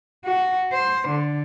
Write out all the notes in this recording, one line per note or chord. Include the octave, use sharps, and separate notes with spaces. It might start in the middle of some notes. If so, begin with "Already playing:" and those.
F#4
C5
D3